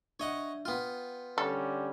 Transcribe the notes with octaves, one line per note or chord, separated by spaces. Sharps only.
D4 C#5 D#5 E5 F#5
B3 F4 G5 F6
D3 G3 C#4 A4